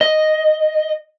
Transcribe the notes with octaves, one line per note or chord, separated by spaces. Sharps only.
D#5